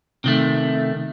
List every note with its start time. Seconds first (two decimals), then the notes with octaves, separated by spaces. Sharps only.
0.24 C3 D#3 A3